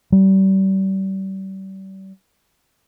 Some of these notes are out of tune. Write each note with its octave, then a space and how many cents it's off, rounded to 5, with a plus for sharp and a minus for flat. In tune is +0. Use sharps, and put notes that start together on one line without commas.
G3 -35